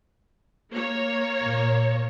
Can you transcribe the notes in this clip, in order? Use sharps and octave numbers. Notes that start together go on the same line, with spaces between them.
A#3 C#5
A#2